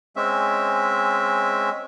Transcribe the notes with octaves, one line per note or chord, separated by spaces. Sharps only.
G#3 C4 C#4 E5